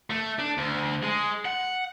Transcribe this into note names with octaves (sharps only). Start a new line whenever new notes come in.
A3
D4
D2
G#3
F#5